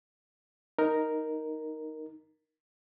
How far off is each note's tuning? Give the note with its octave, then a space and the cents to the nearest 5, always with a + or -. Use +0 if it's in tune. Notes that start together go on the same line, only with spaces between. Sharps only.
D#4 +0 A#4 +0